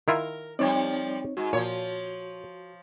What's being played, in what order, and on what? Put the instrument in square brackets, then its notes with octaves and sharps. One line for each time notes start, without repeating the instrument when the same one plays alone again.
[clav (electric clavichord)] D#3 E4 F4 [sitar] A#4
[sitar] F3 G3 D5 [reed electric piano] C4 D#4 C#5
[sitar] G#2 [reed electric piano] F#4
[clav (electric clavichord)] A#2 [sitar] F3 C#5